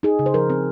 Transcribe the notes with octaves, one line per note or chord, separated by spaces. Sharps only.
D#4 G#4
C#3
C5
F3 A#4
C4